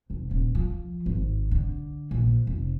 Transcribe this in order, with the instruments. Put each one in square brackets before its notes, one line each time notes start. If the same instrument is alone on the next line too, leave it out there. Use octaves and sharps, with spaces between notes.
[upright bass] F1
D#1
F3
G#1
D3
A#1
F1